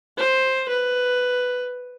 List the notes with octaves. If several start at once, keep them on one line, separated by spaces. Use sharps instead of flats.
C5
B4